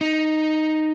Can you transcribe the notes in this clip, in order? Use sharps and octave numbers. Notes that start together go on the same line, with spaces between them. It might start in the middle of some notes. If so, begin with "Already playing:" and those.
D#4